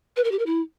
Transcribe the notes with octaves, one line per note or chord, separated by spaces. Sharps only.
B4
A#4
G4
A#4
E4